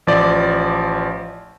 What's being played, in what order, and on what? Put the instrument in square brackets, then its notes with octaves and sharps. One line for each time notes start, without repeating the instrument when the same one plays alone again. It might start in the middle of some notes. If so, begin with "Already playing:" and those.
[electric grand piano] A1 F3 D5